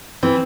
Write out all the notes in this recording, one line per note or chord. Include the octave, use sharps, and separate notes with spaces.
E3 C4